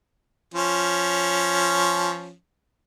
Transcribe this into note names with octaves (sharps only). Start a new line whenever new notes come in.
F3 C#4